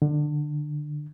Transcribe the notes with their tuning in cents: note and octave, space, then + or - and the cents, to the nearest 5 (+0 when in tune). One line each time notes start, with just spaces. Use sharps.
D3 +20